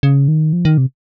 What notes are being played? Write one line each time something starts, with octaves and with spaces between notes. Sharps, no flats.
C#3
D#3
F3
D#3
C3